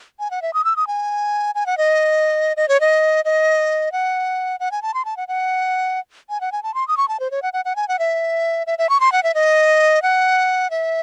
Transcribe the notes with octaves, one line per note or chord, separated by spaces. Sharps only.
G#5
F#5
E5
D#6
E6
D#6
G#5
G#5
F#5
D#5
D#5
C#5
D#5
D#5
F#5
F#5
G#5
A5
C6
A5
F#5
F#5
G#5
F#5
G#5
A5
C6
D#6
C#6
A5
C5
C#5
F#5
F#5
F#5
G#5
F#5
E5
E5
E5
C#6
C6
F#5
E5
D#5
F#5
E5